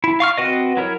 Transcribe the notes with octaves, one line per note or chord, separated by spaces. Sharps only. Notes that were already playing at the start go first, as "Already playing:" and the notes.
E4
F5 C#6 F6
C4 F#4 B4 D#5
F#3 E4 A#4 C#5